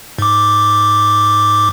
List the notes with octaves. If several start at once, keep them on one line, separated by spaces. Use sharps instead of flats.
G#2 D6